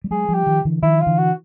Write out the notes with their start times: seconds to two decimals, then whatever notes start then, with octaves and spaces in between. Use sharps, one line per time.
0.04 G3
0.11 F#3 G#3 G#4
0.29 F3 G3
0.34 G4
0.46 D#3 F3
0.65 D3 E3
0.83 D#3 F3 E4
1.01 F4
1.07 D3 E3
1.18 F#4